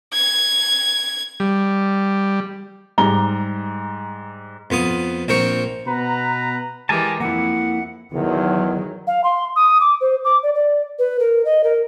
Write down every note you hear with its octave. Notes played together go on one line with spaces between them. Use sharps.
G#6
G3
G#2 G3 A#5 G7
F2 B3 F4 D#6
A#1 C4 A#4 G5 C#6
B2 B3 B4 A#5
E3 G#3 G4 A#4 G#5 A5
F2 A#3 E4 F#5
E2 D#3 F#3
F5
C6
D#6
D6
C5
D6
D5
D5
B4
A#4
D#5
A#4